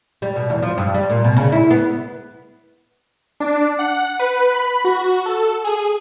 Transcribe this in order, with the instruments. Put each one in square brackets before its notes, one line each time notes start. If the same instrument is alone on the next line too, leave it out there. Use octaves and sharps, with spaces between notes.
[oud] G3
B2
E2
F3
G2
G3
A#2
B2
C#3
E4
B3
[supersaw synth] D4
F#5
B4
B5
F#4
A4
G#4